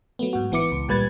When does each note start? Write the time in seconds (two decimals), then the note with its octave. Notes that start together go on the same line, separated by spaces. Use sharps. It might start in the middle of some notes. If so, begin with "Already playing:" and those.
0.19 F#3 A3 B3
0.33 G#2 F#4
0.51 A1 E3 B3 E4 D6 C#7
0.72 C#2
0.88 A1 A#2 G3 B4 G#6 A6